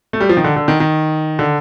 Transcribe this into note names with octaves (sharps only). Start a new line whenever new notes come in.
A3
G3
F3
D#3
D3
D3
D#3
D#3
D3